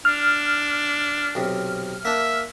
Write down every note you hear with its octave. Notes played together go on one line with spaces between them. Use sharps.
D4 F6
B1 C3
A#3 D4 E5